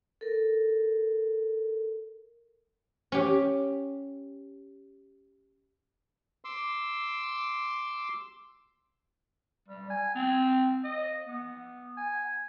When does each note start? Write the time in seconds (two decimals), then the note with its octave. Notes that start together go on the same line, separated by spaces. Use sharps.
0.21 A4 A#4
3.12 C#4 G4
6.45 C6 D6 E6
9.68 G3
9.90 G#5
10.15 C4
10.84 D#5
11.27 B3
11.97 G#5